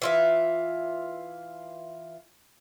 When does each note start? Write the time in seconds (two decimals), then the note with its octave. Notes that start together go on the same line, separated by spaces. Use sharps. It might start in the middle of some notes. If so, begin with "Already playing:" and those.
0.02 E3 F4 E5